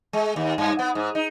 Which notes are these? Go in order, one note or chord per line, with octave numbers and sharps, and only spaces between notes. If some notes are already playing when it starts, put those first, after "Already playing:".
G#3
D#2
G2
B3
G#2
D#4